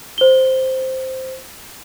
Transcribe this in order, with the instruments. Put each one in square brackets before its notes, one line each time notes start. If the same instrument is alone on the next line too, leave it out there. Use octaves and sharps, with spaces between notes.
[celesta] C5 G7